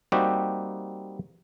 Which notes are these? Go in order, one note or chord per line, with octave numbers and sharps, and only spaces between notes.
G3 A#3 C4 D#4 F#4 G4